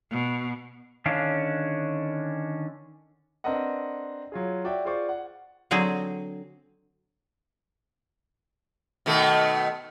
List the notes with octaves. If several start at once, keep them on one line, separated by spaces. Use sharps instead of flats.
B2
D3 D#3 C#4 D4 F5
C4 D4 A#4 B4 D#5 F#5
F#3 F4 G#4
F#4 D5 E5 G5
F4 G#4 C5 D5 C#6
F#5
D3 F#3 C4 G#4
B2 D#3 A3